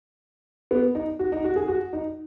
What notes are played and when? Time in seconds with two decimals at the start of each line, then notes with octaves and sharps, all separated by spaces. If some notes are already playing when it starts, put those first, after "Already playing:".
0.71 B3
0.95 D#4
1.19 F#4
1.32 D#4
1.44 F#4
1.56 G#4
1.68 F#4
1.93 D#4